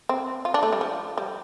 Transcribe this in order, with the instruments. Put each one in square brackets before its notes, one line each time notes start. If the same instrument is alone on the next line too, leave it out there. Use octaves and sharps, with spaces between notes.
[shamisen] C4
F4
D4
A3
G3
F3
G3